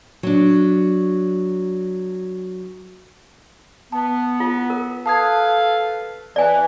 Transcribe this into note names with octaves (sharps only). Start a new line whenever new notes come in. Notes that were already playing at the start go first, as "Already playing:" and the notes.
F#3 D4
B3 A5
F4
A#4
A4 B4 F5 A5 D#6 G#6
E3 D5 G#5